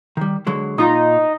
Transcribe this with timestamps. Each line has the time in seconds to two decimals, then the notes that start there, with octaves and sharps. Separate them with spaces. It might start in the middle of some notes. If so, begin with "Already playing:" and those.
0.17 D#3 G3
0.47 D3 F#3 G#3
0.78 A#2 D#4 F4 A#5